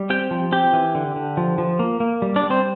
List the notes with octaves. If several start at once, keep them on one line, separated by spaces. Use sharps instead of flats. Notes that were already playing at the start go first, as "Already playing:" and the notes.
Already playing: G3
C4 G4 G5
F3
C4 G4 G5
E3
D3
D3
F3
F3
A#3
A#3
G3
D4 D5
G3
C4 C5